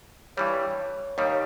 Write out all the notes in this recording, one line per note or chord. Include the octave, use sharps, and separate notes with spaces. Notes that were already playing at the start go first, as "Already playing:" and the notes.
G2 E3 G3 C#5
D#2 D#3 G3 C#5